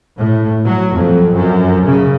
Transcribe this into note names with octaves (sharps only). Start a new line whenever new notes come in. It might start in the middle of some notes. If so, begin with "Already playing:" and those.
A2
F#3
F2
F#2
C#3